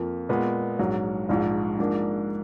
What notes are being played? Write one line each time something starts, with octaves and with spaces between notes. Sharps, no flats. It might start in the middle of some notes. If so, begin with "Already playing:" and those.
Already playing: F2 F3 A#3
A#2 G#3 B3
A#1 G#2 F#3
A#1 G#2 F3
G#2 F3 A#3 D4